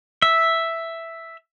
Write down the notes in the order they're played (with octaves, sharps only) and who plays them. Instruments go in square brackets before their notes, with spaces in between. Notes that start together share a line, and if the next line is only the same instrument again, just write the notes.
[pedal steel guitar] E5